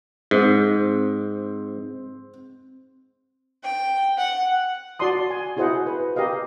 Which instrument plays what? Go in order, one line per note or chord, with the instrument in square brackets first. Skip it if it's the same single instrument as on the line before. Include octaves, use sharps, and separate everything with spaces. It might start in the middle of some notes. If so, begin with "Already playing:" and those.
[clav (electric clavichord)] G#2 [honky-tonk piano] C4
[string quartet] G5
F#5
[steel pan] F#4 D5 A5 C6 D#6
G#5
E4 F#4 G#4 C5 D#5 F#5
B4
G4 A#4 D#5 F5